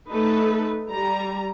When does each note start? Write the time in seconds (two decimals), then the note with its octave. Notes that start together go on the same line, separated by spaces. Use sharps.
0.10 A3 D#4 A4 B4
0.90 G3 A#5